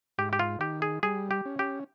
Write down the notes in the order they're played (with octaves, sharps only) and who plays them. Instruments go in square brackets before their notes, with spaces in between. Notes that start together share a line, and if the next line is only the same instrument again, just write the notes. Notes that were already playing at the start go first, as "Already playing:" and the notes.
[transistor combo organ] G#2 [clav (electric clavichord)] G4
[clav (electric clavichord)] G4
F4
[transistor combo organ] D#3 [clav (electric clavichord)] G4
[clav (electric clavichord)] G#4
[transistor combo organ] G3 [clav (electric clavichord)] G#4
[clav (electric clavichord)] G4
[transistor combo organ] C#4
[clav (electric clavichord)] G4